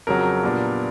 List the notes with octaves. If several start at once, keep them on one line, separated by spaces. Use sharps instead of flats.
F2 C#3 F#3 A#4
A#2 G3 B3 D4